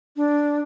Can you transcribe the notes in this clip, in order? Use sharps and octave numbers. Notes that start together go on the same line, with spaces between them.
D4